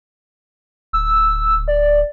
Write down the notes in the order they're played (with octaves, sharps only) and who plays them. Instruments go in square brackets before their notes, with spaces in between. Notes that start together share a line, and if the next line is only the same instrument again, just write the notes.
[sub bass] D1 [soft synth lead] E6
[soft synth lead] D5